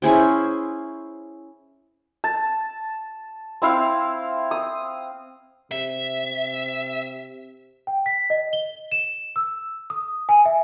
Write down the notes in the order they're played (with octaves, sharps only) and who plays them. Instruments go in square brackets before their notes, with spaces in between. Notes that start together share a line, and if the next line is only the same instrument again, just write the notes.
[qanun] C#4 E4 G#4 C5
[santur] A5
C4 E4 F5
D#6
[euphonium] C3 [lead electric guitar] E5
[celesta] G5
B6
D#5
G7
E7
E6
D#6
G#5
E5